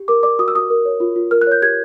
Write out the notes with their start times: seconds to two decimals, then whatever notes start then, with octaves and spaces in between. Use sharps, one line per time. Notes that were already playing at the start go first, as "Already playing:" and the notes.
Already playing: G4
0.08 A#4 D6
0.23 D5 D6
0.39 F#4 D#6
0.48 E6
0.55 F#4 D#6
0.70 A#4
0.85 C#5
1.00 F4
1.16 F4
1.31 A#4 F6
1.41 F#6
1.47 C#5 G6
1.62 G4 G#6